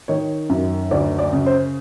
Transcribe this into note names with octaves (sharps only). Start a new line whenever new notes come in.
D#3 C#5
F#2
D2 D5
D5
C#3
C5